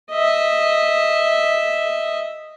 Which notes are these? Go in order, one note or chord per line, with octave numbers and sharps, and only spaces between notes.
D#5 E5